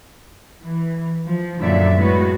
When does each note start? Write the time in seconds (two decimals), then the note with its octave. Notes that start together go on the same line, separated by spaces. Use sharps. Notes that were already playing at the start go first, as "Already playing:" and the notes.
0.62 E3
1.26 F3
1.60 F#2 A#2 D3 D#3 D5 E5
1.95 A2 G#3 B3 F#4